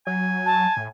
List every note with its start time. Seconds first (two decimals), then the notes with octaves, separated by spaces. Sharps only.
0.07 F#3 G#5
0.46 A5
0.77 A2